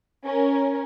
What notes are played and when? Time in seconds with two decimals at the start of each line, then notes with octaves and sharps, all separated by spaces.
0.24 C#4 A#4